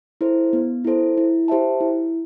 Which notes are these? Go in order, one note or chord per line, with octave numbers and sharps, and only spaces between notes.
E4 A4 C5
B3
E4 A4 C5
E4
G4 C5 E5 A5
E4